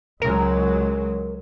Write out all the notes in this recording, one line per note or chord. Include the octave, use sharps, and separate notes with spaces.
C#2 F#3 G#3 A#4